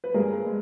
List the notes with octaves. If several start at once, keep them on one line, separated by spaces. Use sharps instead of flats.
B4
G2 G#4 A#4
G#3